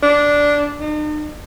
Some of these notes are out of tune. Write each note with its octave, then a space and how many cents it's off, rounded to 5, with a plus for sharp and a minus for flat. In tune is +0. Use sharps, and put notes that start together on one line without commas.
D4 -10
D#4 -45